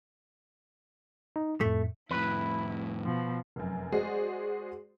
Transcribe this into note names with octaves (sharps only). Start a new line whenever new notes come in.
D#4
F2 A2 A3
F2 A2 E4 B4
B2 F3
F1 F#2
G#3 F#4 G#4 C5 D5